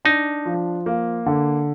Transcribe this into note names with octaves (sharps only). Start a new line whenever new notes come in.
D4 D#4
F3
A#3
D3